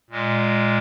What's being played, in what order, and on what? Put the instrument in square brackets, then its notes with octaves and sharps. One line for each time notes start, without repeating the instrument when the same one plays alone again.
[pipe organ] A#2 G#3